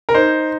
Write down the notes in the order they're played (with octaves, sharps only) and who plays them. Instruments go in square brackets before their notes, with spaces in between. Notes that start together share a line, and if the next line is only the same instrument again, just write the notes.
[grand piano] A#4
D#4 C5